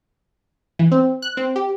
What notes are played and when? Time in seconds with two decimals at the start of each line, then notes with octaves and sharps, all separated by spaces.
0.79 E3
0.92 C4
1.22 F#6
1.37 C4
1.56 G4